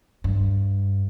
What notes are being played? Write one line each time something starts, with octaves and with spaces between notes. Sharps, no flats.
G2